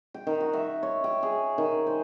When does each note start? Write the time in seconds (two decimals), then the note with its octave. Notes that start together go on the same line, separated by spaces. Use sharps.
0.14 G5
0.27 D#3
0.40 F#4
0.53 E5
0.83 C#5
1.04 G5
1.23 G#4
1.58 D#3
1.86 C5